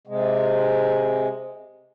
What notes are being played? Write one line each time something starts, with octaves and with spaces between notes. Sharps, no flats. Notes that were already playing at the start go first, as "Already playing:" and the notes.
C3 G#3